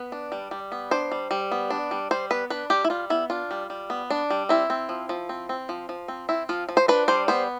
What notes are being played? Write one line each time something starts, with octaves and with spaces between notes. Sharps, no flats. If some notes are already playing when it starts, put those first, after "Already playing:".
Already playing: B3 B4
D4
G3
G3
B3
D4 C5
G3
G3
B3
D4
G3
G3 C5
B3 B4
D4 B4
G3 G4
E4
G3 F4
B3 E4
D4 F4
G3
G3
B3
D4
G3
C4 E4
C4
F3
F3
C4
C4
F3
F3
C4
C4 E4
F3 F4
F3
C5
D4 B4
G3 C5
B3 C5